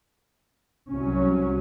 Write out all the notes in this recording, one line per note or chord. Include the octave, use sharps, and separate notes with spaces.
C2 F#3 C#4